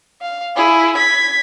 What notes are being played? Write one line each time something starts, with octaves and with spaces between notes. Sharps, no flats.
F5
E4 G#4
G#6 B6